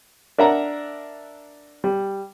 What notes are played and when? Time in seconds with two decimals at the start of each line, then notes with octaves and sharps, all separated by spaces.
0.38 D4 A#4 E5 F#5 A#5
1.84 G3